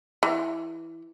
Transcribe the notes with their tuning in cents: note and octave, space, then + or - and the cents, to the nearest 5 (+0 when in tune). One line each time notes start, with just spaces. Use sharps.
E3 +0